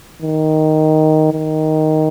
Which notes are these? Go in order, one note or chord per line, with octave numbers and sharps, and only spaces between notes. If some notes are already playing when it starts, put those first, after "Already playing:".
D#3
D#3